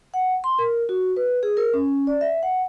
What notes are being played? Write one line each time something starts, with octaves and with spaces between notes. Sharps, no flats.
F#5
C6
A#4
F#4
B4
G#4
A#4
C#4
D5
E5
F#5